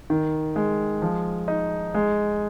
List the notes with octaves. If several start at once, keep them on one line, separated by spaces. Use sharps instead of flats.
D#3
G#3
F3
D#4
G#3